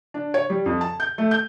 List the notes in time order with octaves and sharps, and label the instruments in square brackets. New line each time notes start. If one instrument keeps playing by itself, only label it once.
[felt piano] D4
C#5
G3
F2
A5
G6
A3
G6